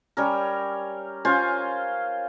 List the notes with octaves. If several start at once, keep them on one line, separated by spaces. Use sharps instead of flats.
G3 C#4 A#4
C#4 F4 C5 G#5